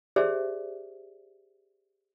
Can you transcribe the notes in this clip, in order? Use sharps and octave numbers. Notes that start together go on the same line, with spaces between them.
G4 G#4 C5 D5 E5